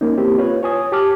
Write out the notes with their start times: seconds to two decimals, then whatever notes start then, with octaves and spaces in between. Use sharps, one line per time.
0.01 A#3 C#4 D#4
0.18 A#3 C4 E4 G4
0.38 F4 B4 C#5
0.63 C#5 G#5 D#6
0.92 G4 A5 D6 F6